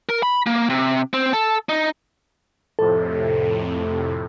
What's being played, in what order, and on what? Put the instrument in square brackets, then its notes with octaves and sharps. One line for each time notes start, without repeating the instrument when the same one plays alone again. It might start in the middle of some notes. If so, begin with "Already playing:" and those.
[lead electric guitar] A#4
B5
A#3
C3
C4
A4
D#4
[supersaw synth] F2 A2 C3 [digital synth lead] A4